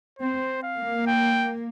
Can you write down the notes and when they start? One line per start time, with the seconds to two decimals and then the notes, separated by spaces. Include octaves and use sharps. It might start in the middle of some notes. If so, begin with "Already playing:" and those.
0.19 C4 C5
0.63 F5
0.78 A#3
1.07 G5